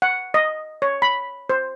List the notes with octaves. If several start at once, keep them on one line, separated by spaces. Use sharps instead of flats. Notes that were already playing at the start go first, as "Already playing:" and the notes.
F#5
D#5
C#5
B5
C5